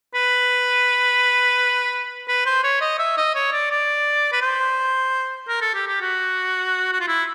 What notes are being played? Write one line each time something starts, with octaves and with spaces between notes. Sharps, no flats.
B4
B4
C5
C#5
D#5
E5
D#5
C#5
D5
D5
B4
C5
A#4
A4
G4
G4
F#4
F#4
F4
E4